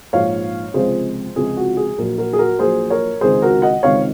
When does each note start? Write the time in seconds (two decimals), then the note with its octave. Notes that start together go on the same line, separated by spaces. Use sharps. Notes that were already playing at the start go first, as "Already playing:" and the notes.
0.13 A#1 G#2 F3 G#3 C#5 F5
0.74 C#2 C3 F3 G#3 G#4 C5
1.36 C#2 C3 F3 G#3 G#4
1.57 F#4
1.77 G#4
1.98 A#1 A#2 F#3 F#4 A#4
2.18 F#4 A#4
2.33 G#4
2.39 F#4 A#4
2.59 A#1 A#2 F#3 G#4 C5
2.90 A#4 C#5
3.21 C#2 C3 D#3 G#3 G#4 C5
3.42 F#4 A#4
3.62 D#5 F#5
3.83 C#2 C3 D#3 G#3 C#5 F5